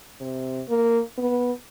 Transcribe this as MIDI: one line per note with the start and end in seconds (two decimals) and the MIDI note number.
0.20 0.61 48
0.69 1.01 58
1.18 1.52 59